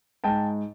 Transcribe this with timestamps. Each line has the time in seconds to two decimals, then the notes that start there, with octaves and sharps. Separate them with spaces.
0.24 G#2 G5 A5